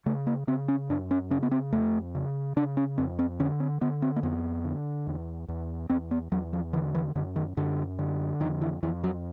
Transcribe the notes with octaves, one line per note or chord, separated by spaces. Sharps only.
C#3 A3
A#3
C#3 C4
C#4
F#2 D4
C#4
C#3 C#4
B3
C4
F2 A3
C#3
C#3 D4
C#4
F2 C4
C4
D3 C#4
C4
D3 B3
C4
A#3
F2 B3
D3
E2
E2
E2 C4
B3
E2 F#3
F3
D3 E3
E3
F#2 D3
D#3
F#2 D3
D3
F2 D#3
E3
F2 E3
F#3